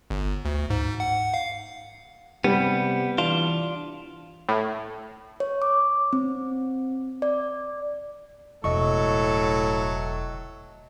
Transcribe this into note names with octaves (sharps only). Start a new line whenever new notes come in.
G1
D2
G#2
F#5
F5
C3 G3 B3
E3 D4 F4
A2
C#5
D6
C4
D5
E1 A2 F#3 A4 D#5 C#6